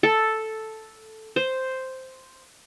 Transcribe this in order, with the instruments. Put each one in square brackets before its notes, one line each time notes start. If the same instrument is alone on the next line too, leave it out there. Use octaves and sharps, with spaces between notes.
[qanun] A4
C5